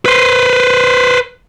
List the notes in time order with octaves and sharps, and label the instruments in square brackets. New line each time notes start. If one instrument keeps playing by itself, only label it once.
[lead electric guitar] B4 C5